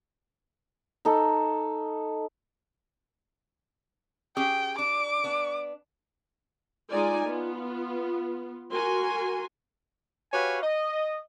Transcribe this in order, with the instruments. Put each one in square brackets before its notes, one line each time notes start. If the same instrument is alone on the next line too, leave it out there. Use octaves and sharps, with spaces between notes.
[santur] D#4 A4
[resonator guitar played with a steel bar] C#4 G4 G#4 [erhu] G5
[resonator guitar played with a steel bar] D4 [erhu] D6
[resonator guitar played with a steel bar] B3 D4
[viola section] G#3 D#4 F4 D5 G#5
B3 F4
F#4 A#4 G#5 C6
[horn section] F#4 G4 B4 C#5 F5 G#5
D#5